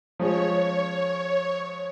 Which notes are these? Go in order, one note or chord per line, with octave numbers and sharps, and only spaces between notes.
F3 G#3 C#4 C#5